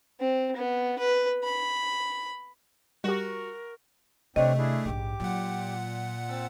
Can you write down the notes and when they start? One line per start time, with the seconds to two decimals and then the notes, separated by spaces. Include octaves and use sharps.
0.20 C4
0.56 B3
0.99 B4
1.43 B5
3.04 G3 F#4 G4 A#4
4.36 C3 D#3 A3 C4 D4 C#5 D#5
4.58 D4 E4 G#4
4.85 A#1 G#2 G4 D6
5.20 A#2 F#3 F#5
6.29 C4 A5 E6